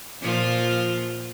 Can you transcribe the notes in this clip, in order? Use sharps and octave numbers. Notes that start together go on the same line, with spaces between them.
A#2 F3 F4